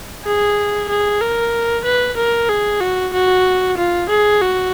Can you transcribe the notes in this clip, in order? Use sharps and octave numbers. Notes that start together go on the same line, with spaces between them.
G#4
G#4
A#4
B4
A#4
G#4
F#4
F#4
F4
G#4
F#4